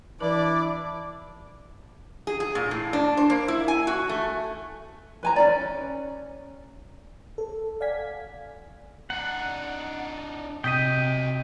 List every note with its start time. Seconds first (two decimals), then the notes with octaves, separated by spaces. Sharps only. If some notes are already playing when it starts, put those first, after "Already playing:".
0.20 E3 D4 E4 B4 D5 D6
2.27 G#4
2.40 G#4
2.55 A#2
2.71 A2
2.93 D4
3.17 C5
3.30 A#3
3.48 E4
3.68 G#5
3.87 F#4
4.09 A3
5.23 B4 G#5 A#5
5.36 C#4 D#4 D5
7.38 A4
7.81 D5 F5 F#5 G#5 G#6 B6
9.10 D4 D#4 F#5
10.64 C3 F#3 D#5 G5 D#6 B6 D#7